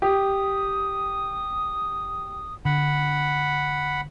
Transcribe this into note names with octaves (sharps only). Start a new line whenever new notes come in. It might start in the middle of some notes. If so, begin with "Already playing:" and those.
G4 D#6
D3 F#5 B5